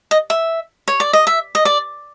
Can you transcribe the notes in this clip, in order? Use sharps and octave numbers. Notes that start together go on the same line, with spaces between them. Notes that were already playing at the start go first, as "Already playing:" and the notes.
D#5
E5
C#5
D5
D#5
E5
D#5
D5